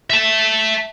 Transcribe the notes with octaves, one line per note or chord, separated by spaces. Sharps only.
E5 A5